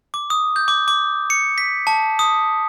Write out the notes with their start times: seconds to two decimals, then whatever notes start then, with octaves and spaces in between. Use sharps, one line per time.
0.14 D6
0.30 D#6
0.56 G6
0.68 D6
0.88 D6
1.30 C#7
1.58 B6
1.87 A5
2.19 D#6